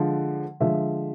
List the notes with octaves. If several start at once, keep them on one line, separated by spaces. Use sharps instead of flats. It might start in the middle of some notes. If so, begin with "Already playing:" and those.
Already playing: D3 F3 G#3
D3 F3 G#3 E5